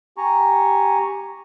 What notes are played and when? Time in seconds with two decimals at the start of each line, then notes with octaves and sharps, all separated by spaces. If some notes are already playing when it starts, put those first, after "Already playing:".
0.17 G4 G#5 A#5 C#6